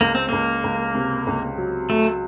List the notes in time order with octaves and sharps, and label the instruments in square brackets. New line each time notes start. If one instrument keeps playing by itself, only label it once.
[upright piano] C#2 [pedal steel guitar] A#3
[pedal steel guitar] C4
[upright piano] C#2 [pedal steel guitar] A#3
[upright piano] C#2
C3
C#2
F#3
[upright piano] F#3 [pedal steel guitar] A3